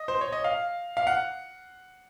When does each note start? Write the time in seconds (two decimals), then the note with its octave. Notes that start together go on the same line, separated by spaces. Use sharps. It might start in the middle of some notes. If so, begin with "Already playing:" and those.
Already playing: D#5
0.08 C5
0.21 C#5
0.32 D#5
0.44 F5
0.97 F5
1.07 F#5